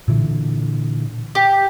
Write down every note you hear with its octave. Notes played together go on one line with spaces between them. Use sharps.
A#2 D3 E3
G4